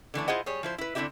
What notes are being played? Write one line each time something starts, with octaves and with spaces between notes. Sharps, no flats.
D3 E3 A3 D4
E4 F4 G#4 C5 D#5 F#5
G3 G#4 C#5
F3 E4 C5
E4 B4
D3 C4 D4 E4 G4 E5